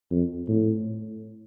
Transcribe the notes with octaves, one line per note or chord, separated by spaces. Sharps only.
F2
A2